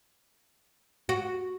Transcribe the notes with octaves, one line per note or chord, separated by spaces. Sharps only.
F#4